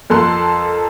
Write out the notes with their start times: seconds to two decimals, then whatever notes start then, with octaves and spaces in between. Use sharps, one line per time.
0.10 F2 A4 A#4 C6 F#6